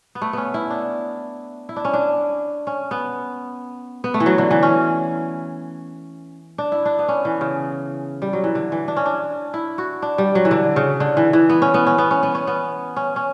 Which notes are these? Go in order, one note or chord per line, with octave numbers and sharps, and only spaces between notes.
B3
A3
B3 C#4
E4
D4
E4
D4
C#4
D4
C#4
B3
B3
A3
E3
F#3
D3
E3
C#4
D4
E4
D4
B3
C#4
E3
C#3
G3
F#3
E3
D3
E3
D4
C#4
D4
E4
F#4
D4
G3
F#3
E3
D3
C#3
D3
E3
E3
B3
C#4
B3
C#4
B3
C#4
B3
C#4
B3
C#4
C#4